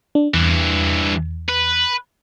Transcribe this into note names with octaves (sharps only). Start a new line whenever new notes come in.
D4
E2 G2 E3
B4